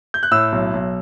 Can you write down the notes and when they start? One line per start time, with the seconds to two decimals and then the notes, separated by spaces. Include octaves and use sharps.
0.14 G6
0.23 F#6
0.31 A2 E6
0.52 B1
0.73 B1